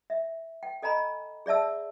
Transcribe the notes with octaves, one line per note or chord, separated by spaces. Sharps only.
E5
G5
A4 D#5 G#5 A#5 B5
G#4 D5 E5 A5 E6